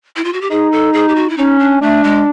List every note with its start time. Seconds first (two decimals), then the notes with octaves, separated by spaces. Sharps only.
0.16 E4
0.24 F4
0.33 F#4
0.41 G4
0.50 D#4 G#4
0.72 A4
0.94 G#4
1.08 G4
1.15 F#4
1.29 E4
1.37 C#4 D#4
1.60 D4
1.81 A3 D4
2.04 G#3